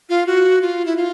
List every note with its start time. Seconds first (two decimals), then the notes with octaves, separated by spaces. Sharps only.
0.09 F4
0.27 F#4
0.61 F4
0.85 E4
0.97 F4